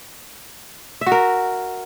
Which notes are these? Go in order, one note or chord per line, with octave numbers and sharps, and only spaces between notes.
E5
F#4
A#4